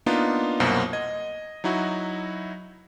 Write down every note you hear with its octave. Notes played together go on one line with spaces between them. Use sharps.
A#3 B3 D4 D#4 F4
C2 F#2 B2 A#3 F#4 C5
D#5 G#6
F#3 D#4 E4 F#4